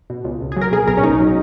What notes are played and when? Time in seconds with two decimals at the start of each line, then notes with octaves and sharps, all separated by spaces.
0.10 B2
0.24 C#2
0.41 C#2
0.52 G#4
0.57 F#3 A#4
0.72 B2 G#4
0.87 B1 A#4
0.97 C#4
1.03 B1 D#4
1.20 F#3